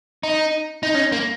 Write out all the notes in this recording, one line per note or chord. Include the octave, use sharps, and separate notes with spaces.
D#4
D#4
C#4
A#3